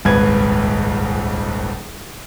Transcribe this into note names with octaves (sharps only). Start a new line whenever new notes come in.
D#1 G#1 C#2 B4 G#6